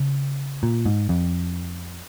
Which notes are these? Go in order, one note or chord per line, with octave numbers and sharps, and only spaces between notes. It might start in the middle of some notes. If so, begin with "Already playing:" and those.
Already playing: C#3
A#2
G#2
F2